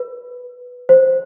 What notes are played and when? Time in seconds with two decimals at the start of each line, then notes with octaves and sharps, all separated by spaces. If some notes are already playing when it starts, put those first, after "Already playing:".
Already playing: B4
0.89 C5